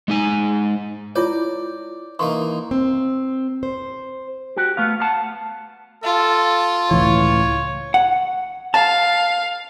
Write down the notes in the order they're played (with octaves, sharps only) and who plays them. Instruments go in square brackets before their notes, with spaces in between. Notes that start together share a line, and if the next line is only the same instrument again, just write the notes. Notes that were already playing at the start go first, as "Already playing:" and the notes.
[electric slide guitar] G#3 D#4 G#5
[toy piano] E4 F4 C#5 [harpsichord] D5
[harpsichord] E3 A#3 D#4 [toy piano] C6 C#6
[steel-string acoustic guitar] C4
C5
[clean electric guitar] F#4 G4
A3 B3 F5
F5 F#5 A5
[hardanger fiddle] F4 [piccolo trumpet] A4
[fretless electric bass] C#2 A2 E3 [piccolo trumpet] C#5
[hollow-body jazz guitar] F#5
[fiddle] F5 [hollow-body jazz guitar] A5